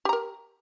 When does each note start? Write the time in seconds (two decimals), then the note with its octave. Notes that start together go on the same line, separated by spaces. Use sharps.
0.05 G4
0.09 A#5
0.13 A#4